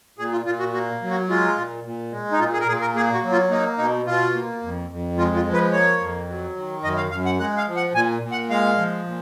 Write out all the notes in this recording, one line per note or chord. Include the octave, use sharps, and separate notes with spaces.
A#2 G#4
F4
A#2 F4
F#4
A#3 F#4
F#3
F#4
G#3 F4
A#2
A#2
G#3
D#4
A#2 F4
G#4
A#4
A#2 G#4
A#4
A#3 G#4
F#4
F#3
F4
A#3 D#4
B2 D#4
B2 F4
A#3
F2
F2
G#3 F4
F4
F3
B4
A#3 C#5
F2
F#3
D#3
F#2 D#5
F5
F#2 F5
F#5
G#3 F#5
F5
F3
F#5
A#2 G#5
A#2
F#5
G#3 F5
F3
A#2